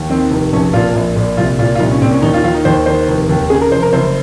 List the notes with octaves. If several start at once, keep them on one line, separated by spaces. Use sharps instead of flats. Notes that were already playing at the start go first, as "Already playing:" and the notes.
Already playing: D#2
D#3 C4
F1
A#1 C#4
A#2 F4
A#1
A#2
C2 F4
A#2 F4
F4
C2 D#4
C#4
A#2 C4
C#4
D#2 D#4
F4
D#3 F4
D#4
D#2 C5
D#3 C5
F1
D#2
C#3 G#4
A#4
F1 C5
A#4
F#1 C5